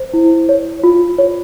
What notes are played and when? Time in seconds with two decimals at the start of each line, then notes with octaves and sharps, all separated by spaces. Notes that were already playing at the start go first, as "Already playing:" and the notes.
Already playing: C5
0.13 E4
0.49 C#5
0.84 F4
1.18 C#5